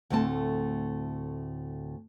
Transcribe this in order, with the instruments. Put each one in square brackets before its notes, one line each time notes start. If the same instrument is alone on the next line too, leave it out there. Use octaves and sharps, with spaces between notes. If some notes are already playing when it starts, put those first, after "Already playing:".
[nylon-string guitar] D2 A2 A3 C4 A5